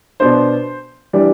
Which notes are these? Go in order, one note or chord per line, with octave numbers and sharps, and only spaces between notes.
B2 B3 D4 C5
E3 G3 D4